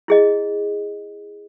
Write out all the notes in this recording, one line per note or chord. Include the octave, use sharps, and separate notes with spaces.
E4 G#4 D#5